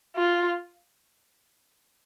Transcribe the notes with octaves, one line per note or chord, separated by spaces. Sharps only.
F4